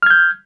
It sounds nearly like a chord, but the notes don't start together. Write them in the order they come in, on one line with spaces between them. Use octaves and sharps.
F6 G#6 G6